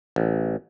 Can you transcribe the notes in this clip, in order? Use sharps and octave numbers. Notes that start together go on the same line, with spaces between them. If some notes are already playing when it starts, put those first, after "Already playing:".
A1